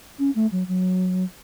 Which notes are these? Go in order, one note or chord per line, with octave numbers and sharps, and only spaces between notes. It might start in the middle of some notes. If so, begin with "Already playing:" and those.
C#4
A3
F#3
F#3